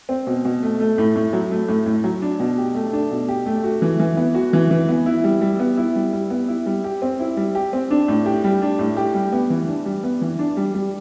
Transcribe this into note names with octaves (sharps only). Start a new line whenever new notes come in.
C4
B2
B2
A3
A3
A2
A2
F#3
A3
A2
A2
F#3
D4
B2
G4
A3
D4
B2
G4
A3
F#4
E3
E3
B3
F#4
E3
E3
B3
E4
G3
G3
B3
E4
G3
G3
B3
E4
G3
G4
C4
E4
G3
G4
C4
D4
A2
G4
G3
D4
A2
G4
G3
B3
E3
D4
G3
B3
E3
D4
G3
G3